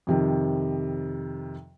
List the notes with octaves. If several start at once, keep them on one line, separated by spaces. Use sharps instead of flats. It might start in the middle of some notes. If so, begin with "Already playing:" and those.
F2 C3 D#3